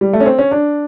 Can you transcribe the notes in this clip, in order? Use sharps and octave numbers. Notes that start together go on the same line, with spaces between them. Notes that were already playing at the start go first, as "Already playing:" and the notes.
G3
A3
C#4
C4
C#4
D4